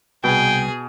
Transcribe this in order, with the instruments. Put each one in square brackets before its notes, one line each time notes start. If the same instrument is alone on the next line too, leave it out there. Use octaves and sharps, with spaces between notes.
[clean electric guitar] C2 B4 [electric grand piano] B2 [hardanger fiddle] G#4 [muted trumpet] G5